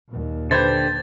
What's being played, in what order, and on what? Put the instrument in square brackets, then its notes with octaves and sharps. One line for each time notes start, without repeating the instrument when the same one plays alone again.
[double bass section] D#2 A#2
[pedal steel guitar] D3 G4 [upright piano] B4 C5 G#6 [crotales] A6